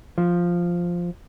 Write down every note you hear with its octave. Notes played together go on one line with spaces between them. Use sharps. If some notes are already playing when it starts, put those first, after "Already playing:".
F3